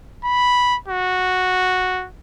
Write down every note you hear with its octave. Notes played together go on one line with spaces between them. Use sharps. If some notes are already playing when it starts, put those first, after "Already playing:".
B5
F#4